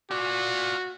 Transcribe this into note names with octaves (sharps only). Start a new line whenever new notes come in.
F4 F#4 D5